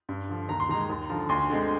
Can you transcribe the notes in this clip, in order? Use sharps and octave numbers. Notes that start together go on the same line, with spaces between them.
G2
D3 F3
D#2 A#5
C6
D#3 G#3 A#5
D#2
D3 F3
D2 C6
D3 G#3 C4